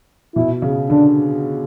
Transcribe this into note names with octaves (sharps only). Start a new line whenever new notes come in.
B2 E4
C#3
D3 D4